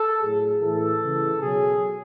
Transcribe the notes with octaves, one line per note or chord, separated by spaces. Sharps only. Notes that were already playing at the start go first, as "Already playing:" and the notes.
Already playing: A4
A2 F#3 G#4
A2 E3 A4
C#3 E3
B2 F#3 G#4